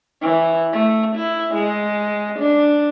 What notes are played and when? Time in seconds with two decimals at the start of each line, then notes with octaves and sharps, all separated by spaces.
0.22 E3
0.73 A3
1.16 E4
1.54 G#3
2.39 D4